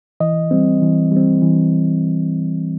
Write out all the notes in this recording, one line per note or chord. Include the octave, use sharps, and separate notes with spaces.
E3 D#5
G3 C4
E3
G3 C4
E3